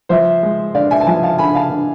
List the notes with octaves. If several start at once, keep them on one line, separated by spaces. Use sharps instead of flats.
F3 C5 E5
G#3
D3 D5 F5
E5 G#5
A5
F3 E5 G#5
F5 A5
D3 G#5 B5
F5 A5
D3